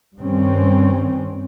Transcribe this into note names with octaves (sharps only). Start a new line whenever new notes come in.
G2 D#3 C4 C#4